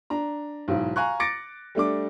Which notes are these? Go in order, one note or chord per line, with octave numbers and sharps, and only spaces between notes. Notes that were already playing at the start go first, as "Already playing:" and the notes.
D4 A#5
B1 G#2 E3
F5 G#5 A#5 C#6 F#6
D6 A6 A#6 C#7 D7
G3 A3 D4 D6